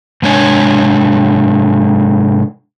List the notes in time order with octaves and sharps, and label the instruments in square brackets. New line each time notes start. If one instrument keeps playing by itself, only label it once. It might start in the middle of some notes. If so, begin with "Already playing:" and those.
[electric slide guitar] G#2 C3 G#3 D4 C#5 G#5